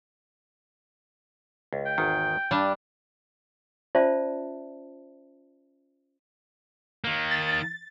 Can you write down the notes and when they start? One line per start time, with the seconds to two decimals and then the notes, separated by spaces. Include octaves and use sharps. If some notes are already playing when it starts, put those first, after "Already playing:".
1.73 C#2
1.85 G5
1.98 G#1 E2 D#3
2.51 G2 G3 D4 A5
3.95 C#4 F4 C5 D5 E5 A5
7.04 D#3 A#3
7.31 A6